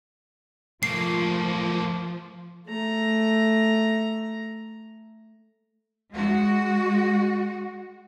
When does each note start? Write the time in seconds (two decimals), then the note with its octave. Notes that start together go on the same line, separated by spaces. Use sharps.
0.83 F3 A3 A#3 C7
2.67 A3 A#5
6.11 G#3 F#4